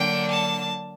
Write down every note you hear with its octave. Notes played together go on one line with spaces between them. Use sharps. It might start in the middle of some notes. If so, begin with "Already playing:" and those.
Already playing: D3 F#3 A#3 D4 G5
A5